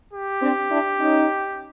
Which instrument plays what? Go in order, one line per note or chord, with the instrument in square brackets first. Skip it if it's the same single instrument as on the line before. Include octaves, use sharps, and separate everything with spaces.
[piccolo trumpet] G4
[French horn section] C4 D4
D4 E4
C#4 D#4